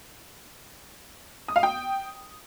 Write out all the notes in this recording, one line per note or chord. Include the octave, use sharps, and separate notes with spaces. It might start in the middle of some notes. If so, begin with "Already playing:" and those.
D#6
F5
G5